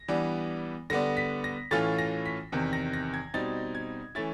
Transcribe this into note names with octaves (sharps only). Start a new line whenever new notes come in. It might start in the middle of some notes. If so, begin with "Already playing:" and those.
Already playing: A#6
E3 G3 B3 D4
D3 G3 B3 D4 A#6
B6
A#6
A2 E3 A3 C#4 F4 A6
A#6
B6
E2 C3 D#3
A#6
A#6
G#6
B2 G3 C4 D#4 A6
G#6
E3 A3 C#4 E4 A6